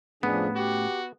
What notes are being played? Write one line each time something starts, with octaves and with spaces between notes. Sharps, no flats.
F2 A2 A3 B3 C#4 D4 G#4
F#4 G4